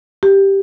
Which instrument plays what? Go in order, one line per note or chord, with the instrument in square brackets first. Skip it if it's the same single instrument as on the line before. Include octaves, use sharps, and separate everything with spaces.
[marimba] G4